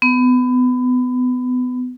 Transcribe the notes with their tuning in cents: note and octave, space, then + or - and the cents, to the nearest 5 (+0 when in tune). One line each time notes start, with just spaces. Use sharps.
B3 +25